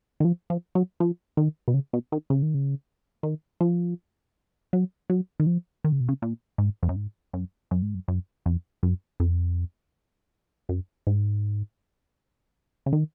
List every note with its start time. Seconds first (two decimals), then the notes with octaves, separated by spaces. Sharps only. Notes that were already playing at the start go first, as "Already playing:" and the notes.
0.20 D#3
0.25 F3
0.50 F3
0.75 F#3
1.00 F3
1.37 D#3
1.68 B2
1.74 C#3
1.93 B2
2.12 D#3
2.30 C#3
2.42 D#3
2.54 C#3
3.23 D#3
3.61 F3
4.73 F#3
5.10 F#3
5.40 D#3
5.47 F3
5.84 D#3
5.92 C#3
6.00 B2
6.09 C#3
6.22 A#2
6.58 G#2
6.83 F2
6.89 F#2
6.96 G#2
7.33 F#2
7.71 F#2
7.82 G#2
7.95 F#2
8.08 F#2
8.46 F2
8.83 F#2
9.20 F2
10.69 F#2
11.07 G#2
12.86 C#3
12.93 D#3